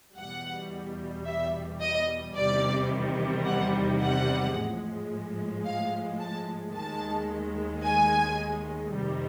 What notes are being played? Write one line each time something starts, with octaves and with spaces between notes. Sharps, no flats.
E2 B2 G3 F#5
E5
D#5
E2 C3 D#3 G3 D5
F#5
F#5
A2 F3 G#3
F5
A5
D#2 D#3 G#3 A5
G#5
F2 C3 D#3 G3